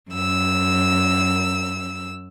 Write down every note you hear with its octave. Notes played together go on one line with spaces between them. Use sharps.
F#2 E6